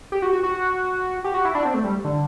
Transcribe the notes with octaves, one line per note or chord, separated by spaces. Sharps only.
G4
F#4
F#4
F#4
G4
F#4
E4
D4
C4
A3
G3
D3